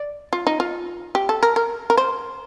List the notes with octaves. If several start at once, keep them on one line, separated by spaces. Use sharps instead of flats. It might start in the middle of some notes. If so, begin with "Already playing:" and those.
Already playing: D5
F4
D#4
F4
G4
A4
A#4
A#4
A#4
C5